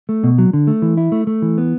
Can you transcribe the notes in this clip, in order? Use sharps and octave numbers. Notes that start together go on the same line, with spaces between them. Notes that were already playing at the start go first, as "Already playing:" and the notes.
A3
B2
F#3
D3
A3
E3
E4
A3
A3
E3
B3